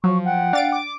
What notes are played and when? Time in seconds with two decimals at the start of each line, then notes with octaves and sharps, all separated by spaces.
0.04 F3 F#3 C#6
0.26 F#5 G5
0.53 D4 F5 A6 D7
0.72 D6